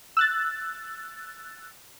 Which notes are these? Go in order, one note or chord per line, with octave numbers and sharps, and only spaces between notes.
E6 F#6 A6